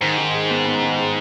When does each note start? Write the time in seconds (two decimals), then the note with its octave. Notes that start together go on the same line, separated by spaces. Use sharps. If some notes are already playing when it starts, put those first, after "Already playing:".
0.01 G#2 D#3
0.18 D#3
0.34 G#4
0.50 B3
0.65 B3
0.82 D#3
0.98 G#4